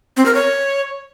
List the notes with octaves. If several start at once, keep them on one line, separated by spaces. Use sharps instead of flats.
C4
A#4
C#5